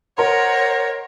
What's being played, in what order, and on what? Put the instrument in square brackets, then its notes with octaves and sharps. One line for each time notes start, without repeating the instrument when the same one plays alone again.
[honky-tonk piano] A#4 C6 [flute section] C5 D#5 F#5 [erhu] C#5